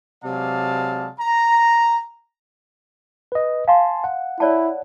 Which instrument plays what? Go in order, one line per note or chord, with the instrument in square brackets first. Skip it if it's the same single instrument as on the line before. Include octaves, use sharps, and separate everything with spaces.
[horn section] C3 F#3 G#3 D5 F5 A5
A#5
[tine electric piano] B4 D#5
[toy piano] F5 [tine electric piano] G#5 A5 C6
[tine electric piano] F#5
[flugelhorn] E4 [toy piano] C#5 D5 A5